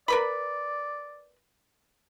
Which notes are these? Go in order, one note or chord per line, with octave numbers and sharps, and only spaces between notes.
A#4 B4 D5 B5